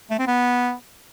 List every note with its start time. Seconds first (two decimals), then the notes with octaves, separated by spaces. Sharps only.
0.10 A3
0.19 C4
0.27 B3